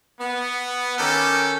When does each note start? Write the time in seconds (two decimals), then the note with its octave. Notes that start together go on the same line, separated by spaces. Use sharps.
0.20 B3
0.98 D#3 C#4 G4 A4